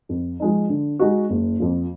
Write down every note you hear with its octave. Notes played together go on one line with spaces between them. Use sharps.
F2
F3 G#3 D#4
D3
G#3 D#4 F#4
F#1
F2 F3